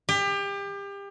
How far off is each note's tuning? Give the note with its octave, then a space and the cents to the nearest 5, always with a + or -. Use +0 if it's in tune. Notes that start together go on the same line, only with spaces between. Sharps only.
G4 +30